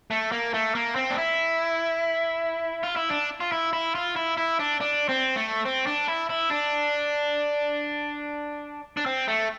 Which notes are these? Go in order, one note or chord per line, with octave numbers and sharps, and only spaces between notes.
A3
A#3
A3
A#3
C4
D4
E4
F4
E4
D4
F4
E4
E4
F4
E4
E4
D4
D4
C4
A3
C4
D4
E4
E4
D4
D4
C4
A3